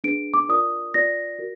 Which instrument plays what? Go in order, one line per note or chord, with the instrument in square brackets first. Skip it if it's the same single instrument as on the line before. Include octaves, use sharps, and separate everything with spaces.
[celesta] D4 G#4 B4 D7
D6
F4 A#4 D5 D#6
F4 B4 D5 A#6
F#4 A#4